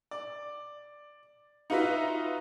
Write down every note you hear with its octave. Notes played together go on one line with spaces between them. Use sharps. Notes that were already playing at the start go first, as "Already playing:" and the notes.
D5
D#4 F4 F#4 B4 D#5 E5